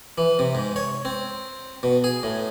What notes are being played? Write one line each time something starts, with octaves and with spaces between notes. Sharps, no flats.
E3
C3
G#2
C#5
C4
B2
G#4
A2